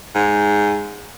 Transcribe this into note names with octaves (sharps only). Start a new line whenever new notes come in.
G#2